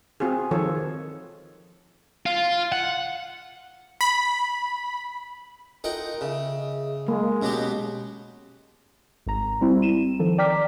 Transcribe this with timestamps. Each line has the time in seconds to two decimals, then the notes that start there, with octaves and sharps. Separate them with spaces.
0.20 C4 F4 F#4 G#4
0.51 D#3 F3 F4 A4 C#5
2.26 F4
2.72 F#5
4.01 B5
5.84 D#4 F4 A4 A#4 F#5 G5
6.21 C#3 G#4 D#5 E5
7.08 F#3 G#3 A#3
7.42 B2 F#3 C#4 G4
9.26 G#1 A#5
9.61 G3 C4 E4
9.82 D#7 E7
10.19 D#3 F3 A4
10.38 D5 G5 A#5 D6 F6 B6